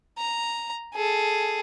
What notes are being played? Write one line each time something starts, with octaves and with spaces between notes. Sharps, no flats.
A#5
G#4 A4